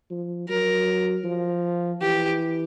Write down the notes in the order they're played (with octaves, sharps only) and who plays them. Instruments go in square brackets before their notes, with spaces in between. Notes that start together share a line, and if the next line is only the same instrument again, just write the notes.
[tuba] F3
[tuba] F#3 [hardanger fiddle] A#4
[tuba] F3
[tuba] E3 [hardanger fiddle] G4